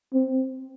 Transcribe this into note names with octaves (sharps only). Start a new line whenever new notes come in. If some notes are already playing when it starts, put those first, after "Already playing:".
C4